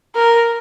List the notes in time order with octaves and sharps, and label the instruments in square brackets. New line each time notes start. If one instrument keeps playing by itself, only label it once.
[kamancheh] A#4